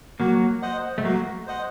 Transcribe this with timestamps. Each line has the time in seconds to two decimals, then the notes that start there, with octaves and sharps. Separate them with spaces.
0.20 F#3 A#3 F#4
0.62 C5 D#5 F#5
0.98 A3
1.05 F#3 A#3 F#4
1.47 C5 D#5 F#5